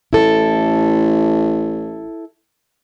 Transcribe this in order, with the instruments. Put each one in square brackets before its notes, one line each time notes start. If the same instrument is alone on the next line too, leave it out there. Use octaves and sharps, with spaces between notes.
[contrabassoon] A1 [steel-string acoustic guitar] E4 A4